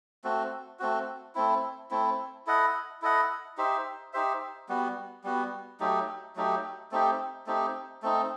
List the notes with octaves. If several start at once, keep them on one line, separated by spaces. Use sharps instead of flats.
A3 C4 F#4
A3 C4 F#4
A3 C4 E4
A3 C4 E4
E4 A4 D#5 F#5
E4 A4 D#5 F#5
D#4 G4 C5 E5
D#4 G4 C5 E5
G3 B3 F#4
G3 B3 F#4
F#3 A3 D#4 G4
F#3 A3 D#4 G4
A3 C4 D#4 G4
A3 C4 D#4 G4
A3 C4 D#4